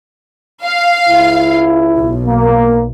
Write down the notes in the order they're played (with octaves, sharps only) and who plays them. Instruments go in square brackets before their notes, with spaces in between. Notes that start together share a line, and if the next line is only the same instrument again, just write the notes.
[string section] F5
[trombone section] C#2 E4
[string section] B1
[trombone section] A#3